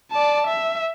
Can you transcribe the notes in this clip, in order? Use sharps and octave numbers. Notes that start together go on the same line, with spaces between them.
D5 A5
E5